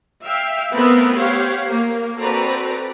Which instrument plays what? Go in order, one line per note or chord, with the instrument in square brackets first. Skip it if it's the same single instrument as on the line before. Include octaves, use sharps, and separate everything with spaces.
[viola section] E5 F5 G5
A3 B3 C4 A#4
G4 C5 C#5 F5 F#5
A#3
C4 F#4 A4 B4 D5 A#5